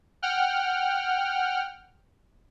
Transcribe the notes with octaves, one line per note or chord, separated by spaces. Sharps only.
F#5 G5 F6